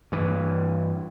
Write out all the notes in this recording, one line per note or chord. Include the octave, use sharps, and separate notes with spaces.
G2 E3